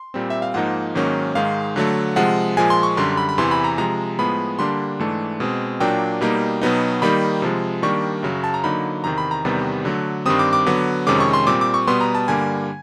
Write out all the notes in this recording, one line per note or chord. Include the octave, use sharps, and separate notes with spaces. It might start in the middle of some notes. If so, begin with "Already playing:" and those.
Already playing: C6
A#2 G3 C4
E5
F5
G#2 F3 A#3 D#4 F#5
G#2 D#3 F#3 A#3 C#4
G#2 D#3 G#3 F5
D3 F#3 A3
C3 F3 G#3 F#5
A#2 F3 G#3 G#5
C6
C#6
F#2 D3 G3 C6
B5
B5
E2 C3 E3 C6
B5
A#5
C3 F3 G#3 A#5
A2 F3 G#3 B3 B5
D3 G3 A#3 D4 C6
G#2 E3 A3 D4
B2 G#3 C4
A#2 F#3 A#3 D4 G5
B2 G3 A#3 D#4
B2 F#3 B3 D#4
D#3 G3 A#3 D#4 B5
C3 F3 G#3
D#3 G3 A#3 D4 C#6
F#2 C#3 F#3
A5
A#5
D3 F#3 A#3 D#4 B5
E2 C3 D#3 A#5
B5
A#5
E2 C3 D#3 G3 B3
D3 F#3 A3
G2 D#3 G3 C4 D#6
D6
D6
D3 F#3 B3
F2 C3 D#3 G#3 C#4 D6
C#6
C6
A#2 G3 C4 D6
D6
C#6
B2 G3 B3 C6
A#5
A5
G2 D3 G3 A#3 G#5